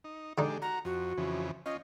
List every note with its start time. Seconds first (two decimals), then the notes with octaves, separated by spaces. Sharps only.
0.04 D#4
0.38 D3 G#3 D4 D#4 G4
0.62 F#4 A#5
0.85 F2 F#4
1.18 F2 C#3 E3
1.66 C#4 F4 D#5